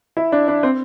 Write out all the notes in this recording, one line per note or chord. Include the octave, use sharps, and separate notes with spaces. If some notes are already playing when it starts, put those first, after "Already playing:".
E4
D4
D4
C4